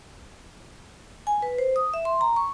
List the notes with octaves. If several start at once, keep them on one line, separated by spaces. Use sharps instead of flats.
G#5
B4
C5
D#6
E5
C6
A#5
C#6